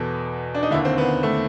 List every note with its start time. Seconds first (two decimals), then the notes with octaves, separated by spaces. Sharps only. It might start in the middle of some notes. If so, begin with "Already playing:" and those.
Already playing: E2 B2 A4
0.55 D4
0.63 D#4
0.71 D3 E4
0.75 D#2
0.85 C4
0.98 B3
1.23 A3